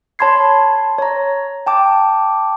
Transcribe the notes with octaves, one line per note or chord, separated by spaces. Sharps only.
C#5 A5 B5 C6 G#6 C7
C#5 A#5
G5 A5 D6